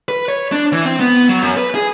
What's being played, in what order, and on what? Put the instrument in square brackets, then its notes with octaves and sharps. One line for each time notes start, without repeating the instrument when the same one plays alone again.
[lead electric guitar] B4
C#5
D4
E3
C4
B3
F#3
F#2
B4
G#4